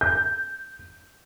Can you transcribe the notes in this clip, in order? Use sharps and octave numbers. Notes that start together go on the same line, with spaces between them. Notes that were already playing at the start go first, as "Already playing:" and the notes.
G6